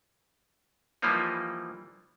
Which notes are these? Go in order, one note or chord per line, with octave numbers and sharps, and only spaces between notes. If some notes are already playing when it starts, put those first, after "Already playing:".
E3 F3 G3 A#3 D#4